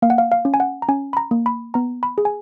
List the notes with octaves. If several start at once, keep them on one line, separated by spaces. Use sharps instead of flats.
A#3 F5
F#5
F5
F5
C#4
G#5
F#5
A#5
C#4 G#5
B5
A#5
A#3
B5
B3 A#5
B5
G#4
G#5